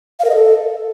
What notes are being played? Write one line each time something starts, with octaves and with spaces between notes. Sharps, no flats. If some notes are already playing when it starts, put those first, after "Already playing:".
F5
A#4
D#5
A4